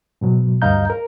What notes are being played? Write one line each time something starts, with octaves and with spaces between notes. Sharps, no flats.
G#2 B2 F#3
D2 G2 D#5 F5 A#5 G6
A#4